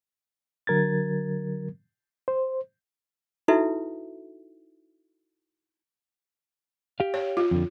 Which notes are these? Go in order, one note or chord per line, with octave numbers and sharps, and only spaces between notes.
D3 F#3 A#4 G#6 A6
C5
D#4 E4 F#4 A4 B4 E5
G4 F5
C#5
F4
F2 D3